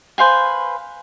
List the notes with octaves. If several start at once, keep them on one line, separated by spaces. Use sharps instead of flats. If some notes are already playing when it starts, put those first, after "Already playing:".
B4 C5 F5 G#5